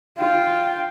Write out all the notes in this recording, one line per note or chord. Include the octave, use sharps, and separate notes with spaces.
F4 G5